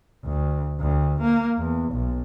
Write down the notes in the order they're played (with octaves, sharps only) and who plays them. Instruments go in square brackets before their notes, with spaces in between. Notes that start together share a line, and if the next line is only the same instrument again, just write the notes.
[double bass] D2
D2
A#3
E2
B1